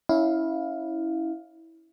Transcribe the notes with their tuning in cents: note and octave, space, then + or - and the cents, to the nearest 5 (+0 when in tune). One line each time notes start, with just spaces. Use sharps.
C#4 +15 E4 -15 F5 +10